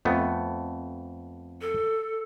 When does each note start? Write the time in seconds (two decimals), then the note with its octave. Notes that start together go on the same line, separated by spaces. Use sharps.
0.05 F2 A3 B3
1.61 A4